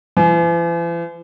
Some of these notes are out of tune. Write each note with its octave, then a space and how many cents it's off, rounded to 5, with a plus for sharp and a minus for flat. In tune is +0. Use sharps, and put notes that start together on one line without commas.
E3 +45